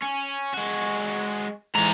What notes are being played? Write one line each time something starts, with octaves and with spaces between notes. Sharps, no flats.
C#4
G#3 F#4
G#2 E3 A#5